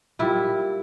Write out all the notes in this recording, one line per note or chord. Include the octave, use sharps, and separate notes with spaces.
A#2 G3 E4